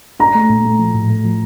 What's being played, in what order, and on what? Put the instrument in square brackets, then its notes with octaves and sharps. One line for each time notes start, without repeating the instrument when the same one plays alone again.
[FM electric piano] D4 [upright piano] A#5
[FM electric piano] A3
A#2
A3
F3
A2
A3
F3